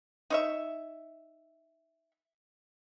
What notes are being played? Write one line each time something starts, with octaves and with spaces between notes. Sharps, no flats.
D#4 C#5 E5